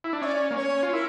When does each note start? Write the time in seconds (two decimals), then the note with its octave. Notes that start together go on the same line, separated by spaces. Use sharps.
0.04 E4
0.13 D4
0.22 C#4 E5
0.25 D5
0.51 A#3
0.56 C#4 C#5
0.83 F4
0.93 E4 A#4